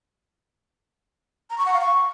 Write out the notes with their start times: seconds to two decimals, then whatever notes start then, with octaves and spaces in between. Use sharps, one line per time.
1.50 A#5
1.58 C#6
1.66 F#5
1.73 F5
1.81 C#6